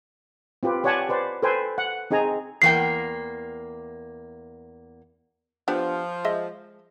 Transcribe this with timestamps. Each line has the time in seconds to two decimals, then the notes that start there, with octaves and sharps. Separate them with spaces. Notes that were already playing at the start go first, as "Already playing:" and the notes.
0.63 C4 F4 G4 B4
0.84 G4 C#5 D5 F#5 G#5 A5
1.09 B4 C5 D5 F#5
1.43 A4 B4 C5 G5 G#5
1.78 F#5
2.11 C4 D#4 G#4 G#5 A#5
2.62 E2 A#3 G5 C7
5.68 F3 B3 D4 G4
6.25 G#3 D#5 E5